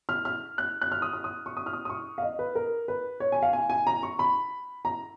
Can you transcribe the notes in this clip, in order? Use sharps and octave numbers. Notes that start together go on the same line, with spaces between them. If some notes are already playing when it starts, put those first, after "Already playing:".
F6
F6
F#6
F#6
F6
D#6
F6
D#6
C#6
D#6
F6
D#6
D#6
C#6
F5
D#5
B4
A#4
B4
C#5
G#5
F5
G#5
G#5
A#5
C#6
B5
A#5